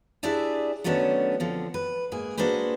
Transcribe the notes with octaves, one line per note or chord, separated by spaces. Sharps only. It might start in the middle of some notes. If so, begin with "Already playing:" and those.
D4 E4 G4 G#4 D5 E5
D#3 F#3 A3 B3 C#4 D4
D3 F3 C4
B4
G#2 A#3 G#4
A#3 D4 F#4 G#4 B4 C5